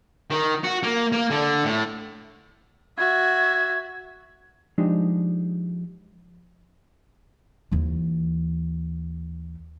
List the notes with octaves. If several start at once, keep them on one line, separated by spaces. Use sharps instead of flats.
D#3
F#4
A#3
A#3
D3
A2
F#4 E5 G#6
F3 G#3 D4 D#4 G4
D#2 E3